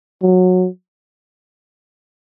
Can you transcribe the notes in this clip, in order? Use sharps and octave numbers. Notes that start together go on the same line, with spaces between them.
F#3